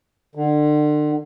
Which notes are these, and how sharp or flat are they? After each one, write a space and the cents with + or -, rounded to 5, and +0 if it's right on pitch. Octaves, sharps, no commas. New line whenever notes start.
D3 +35